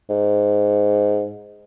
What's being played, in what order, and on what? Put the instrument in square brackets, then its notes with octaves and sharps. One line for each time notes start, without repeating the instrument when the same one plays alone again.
[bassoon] G#2